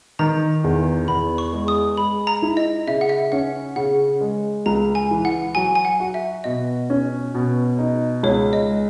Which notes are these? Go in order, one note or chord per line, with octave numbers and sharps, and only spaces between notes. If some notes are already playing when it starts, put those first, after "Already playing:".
D#3 A#5
E2
E2 B5
C#6
G#3
D#6
G#3 B5
A#5
E4
D#5
C#3 E5
F#5
E5
C#4 F#5
C#3 F#5
G#3
C#2 A#5
G#5
E3
F#5
F#3 G#5
G#5
F#5
F#4
E5
B2 D#5
C#4
B2
D#4
C#2 C#5
D#5
G#3